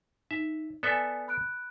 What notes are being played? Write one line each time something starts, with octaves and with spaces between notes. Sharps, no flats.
D#4 E5
B3 A4 D5 E5 G#5
B5 F#6 D7